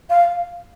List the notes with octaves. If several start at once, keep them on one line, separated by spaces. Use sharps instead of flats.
F5